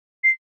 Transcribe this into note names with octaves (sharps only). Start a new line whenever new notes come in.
C7